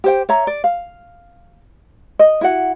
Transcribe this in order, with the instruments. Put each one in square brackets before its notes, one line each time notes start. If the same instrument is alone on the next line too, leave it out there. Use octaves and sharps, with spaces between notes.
[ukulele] G4 C5 G5
C#5 E5 A#5
D5
F5
D#5
E4 F#4 F#5